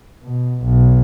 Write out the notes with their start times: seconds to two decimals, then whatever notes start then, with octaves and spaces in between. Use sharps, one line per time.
0.24 B2
0.65 B1